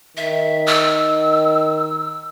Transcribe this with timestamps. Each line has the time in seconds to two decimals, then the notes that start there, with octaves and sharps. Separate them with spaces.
0.17 D#3 E5
0.67 E6